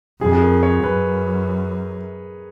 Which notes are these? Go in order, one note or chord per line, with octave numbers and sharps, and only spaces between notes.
F2 G#4
G#4
A#4
C#5
F#2 B4